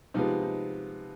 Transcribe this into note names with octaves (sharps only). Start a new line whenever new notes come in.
C3 F3 G#3 B3 D#4
D#4